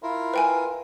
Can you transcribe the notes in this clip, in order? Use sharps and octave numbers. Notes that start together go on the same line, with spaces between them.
E4 F4 A#4
B4 G5 G#5